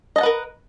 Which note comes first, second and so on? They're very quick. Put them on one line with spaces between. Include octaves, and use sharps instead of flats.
D#5 A5 F#5 B4 A#4